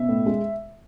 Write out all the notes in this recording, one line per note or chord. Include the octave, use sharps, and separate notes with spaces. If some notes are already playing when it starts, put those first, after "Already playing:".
Already playing: B2 E5
A2
G#3